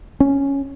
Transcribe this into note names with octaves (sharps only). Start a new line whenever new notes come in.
C#4